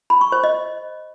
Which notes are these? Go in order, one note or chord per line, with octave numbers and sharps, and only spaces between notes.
B5
C#6
C5
D#5